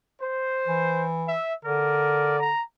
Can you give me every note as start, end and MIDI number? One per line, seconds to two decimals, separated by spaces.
0.21 1.07 72
0.67 1.35 52
1.26 1.52 76
1.65 2.50 50
1.65 2.38 70
1.65 2.38 74
2.39 2.61 82